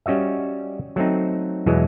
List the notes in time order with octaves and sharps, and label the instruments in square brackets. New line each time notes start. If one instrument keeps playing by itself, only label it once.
[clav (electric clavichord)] G3 C#4 F#4 D#5 E5
F#3 A3 C4 D#4
E2 B2 E3 F#3 G#3